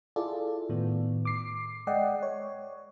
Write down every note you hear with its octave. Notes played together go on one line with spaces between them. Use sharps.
E4 F4 G#4 A4 D5
A2 D#3 B3
D6 C7
G#3 D5 D#5 F#5 G5
C#5